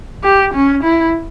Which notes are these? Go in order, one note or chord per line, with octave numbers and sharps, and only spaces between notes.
G4
C#4
E4